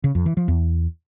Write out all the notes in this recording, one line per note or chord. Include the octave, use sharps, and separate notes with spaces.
C#3
F2
E3
F3
E2